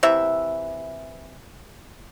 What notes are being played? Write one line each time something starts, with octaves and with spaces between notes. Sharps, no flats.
C3 E3 E5